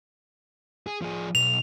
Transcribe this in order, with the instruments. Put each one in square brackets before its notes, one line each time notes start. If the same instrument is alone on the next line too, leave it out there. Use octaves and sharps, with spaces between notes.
[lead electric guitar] G#4
F3 G#4
[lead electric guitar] B1 [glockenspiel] F7